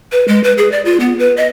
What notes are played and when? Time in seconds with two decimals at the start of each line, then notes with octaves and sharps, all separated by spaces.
0.12 B4
0.28 G#3
0.44 B4
0.58 G#4
0.72 D5
0.85 F4
1.00 B3
1.19 B4
1.37 D#5